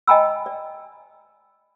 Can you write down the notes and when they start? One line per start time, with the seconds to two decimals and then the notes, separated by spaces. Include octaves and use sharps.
0.07 D#5 G5 G#5 A#5 B5 E6
0.46 D5